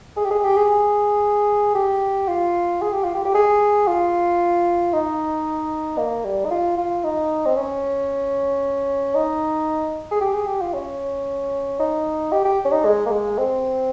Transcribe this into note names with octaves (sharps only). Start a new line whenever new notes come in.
G#4
G4
G#4
G4
G#4
G4
F4
G#4
G4
F4
G4
G4
G#4
F4
D#4
A#3
G3
D#4
F4
F4
D#4
C4
C#4
D#4
G#4
G4
G#4
G4
F4
C#4
D#4
G4
G4
C#4
D#4
G#3
A#3
G#3
C4